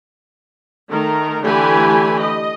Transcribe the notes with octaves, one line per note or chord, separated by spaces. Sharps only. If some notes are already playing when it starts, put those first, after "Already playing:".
D#3 A3 A#4
D3 E3 A3 G4 G#5 B5
D#5